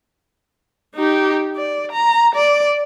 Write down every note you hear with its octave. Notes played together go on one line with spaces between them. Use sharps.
D#4 G4
D5
A#5
D5